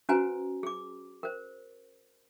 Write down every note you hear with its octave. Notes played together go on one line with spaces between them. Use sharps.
C#4 F#4 B4 C5 G#5 A#5
G#4 D6
A#4 C5